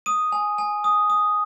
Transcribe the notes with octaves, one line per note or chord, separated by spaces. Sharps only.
D#6 D#7
G#5
G#5
D#6
D#6